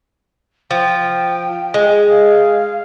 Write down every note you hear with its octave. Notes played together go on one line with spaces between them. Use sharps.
F3 G5
G#3
F5